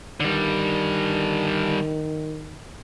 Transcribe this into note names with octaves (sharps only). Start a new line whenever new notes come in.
D3 D#3 G3